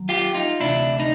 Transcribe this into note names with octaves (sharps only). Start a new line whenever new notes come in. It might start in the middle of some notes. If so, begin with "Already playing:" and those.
Already playing: D#2 F#3
F4 G4
D#4 F4
D2 C3 E3 D4 E4
D#4